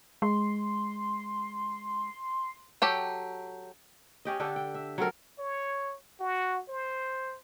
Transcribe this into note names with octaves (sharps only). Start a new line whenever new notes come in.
G#3 C6
F#3 G4 A4 G5
C#4 G4 D#5
D3 D4 G4 A4
G5
E5
F#3 C4 A4 A#4
C#5
F#4
C5